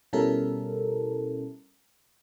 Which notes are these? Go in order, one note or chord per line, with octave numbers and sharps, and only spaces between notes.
B2 G3 C#4 E4 A4 A#4